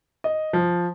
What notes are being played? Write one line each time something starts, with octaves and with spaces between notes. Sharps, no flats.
D#5
F3